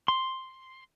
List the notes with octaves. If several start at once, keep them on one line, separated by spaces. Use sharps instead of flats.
C6